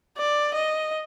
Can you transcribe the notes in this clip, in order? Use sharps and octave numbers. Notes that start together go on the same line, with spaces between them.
D5
D#5